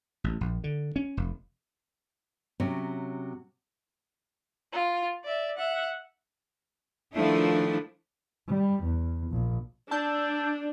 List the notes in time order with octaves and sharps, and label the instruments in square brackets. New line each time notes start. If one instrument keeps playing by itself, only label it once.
[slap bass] A1
A#1
D3
C#4
F1
[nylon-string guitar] C3 F#3 C#4
[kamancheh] F4
D5 E5
E5 F#5
[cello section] D#3 F3 A3 D4 E4
[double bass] G3
E2
A#1
[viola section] D4 [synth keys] A5 E6 G6